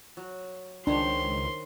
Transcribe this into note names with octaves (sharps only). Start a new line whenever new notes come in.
F#3
C#2 D#3 D4 C5 C#5 C6